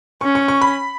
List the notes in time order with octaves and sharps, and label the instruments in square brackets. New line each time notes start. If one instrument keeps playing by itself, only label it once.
[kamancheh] C#4 [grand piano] C#6
[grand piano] C#6
C#6
B5